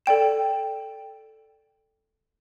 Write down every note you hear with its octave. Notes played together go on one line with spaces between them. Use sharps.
A4 D5 G5 E7